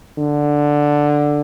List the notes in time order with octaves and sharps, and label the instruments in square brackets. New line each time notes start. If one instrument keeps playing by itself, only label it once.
[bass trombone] D3